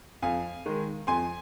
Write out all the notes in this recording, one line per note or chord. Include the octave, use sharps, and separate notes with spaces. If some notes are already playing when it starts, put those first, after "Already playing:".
F2 F5 G#5
D#3 G#3
F2 G#5 C6